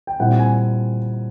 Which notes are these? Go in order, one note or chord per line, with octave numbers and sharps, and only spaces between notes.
G5
A#2 G3 C4 E4 F#5
G#5